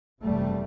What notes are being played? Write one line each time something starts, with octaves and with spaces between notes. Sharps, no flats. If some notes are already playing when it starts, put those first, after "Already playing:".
F#1 E2 C3 G3 A3